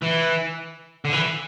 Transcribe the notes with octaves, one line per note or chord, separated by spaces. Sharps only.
E3
D3
E3